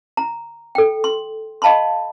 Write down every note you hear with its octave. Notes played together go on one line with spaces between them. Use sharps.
A#5
A4 G5
C6
D#5 F5 A5 B5 C6